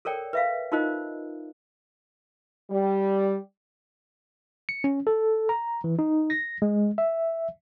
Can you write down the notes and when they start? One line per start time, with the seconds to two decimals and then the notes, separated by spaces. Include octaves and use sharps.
0.05 A4 A#4 C#5 D5 G5
0.33 B4 E5 F5
0.72 D#4 F4 A#4 C5 D#5
2.71 G3
4.69 C#7
4.84 C#4
5.07 A4
5.49 A#5
5.84 E3
5.99 D#4
6.30 A#6
6.62 G#3
6.98 E5